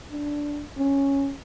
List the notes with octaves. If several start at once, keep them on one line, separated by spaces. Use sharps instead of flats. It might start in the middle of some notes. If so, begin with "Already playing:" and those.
D4
C#4